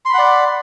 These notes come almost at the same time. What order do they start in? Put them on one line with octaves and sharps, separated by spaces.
C6 B5 F#5 D5